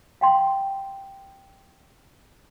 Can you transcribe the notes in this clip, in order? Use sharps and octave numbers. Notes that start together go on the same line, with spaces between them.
F5 G5 C6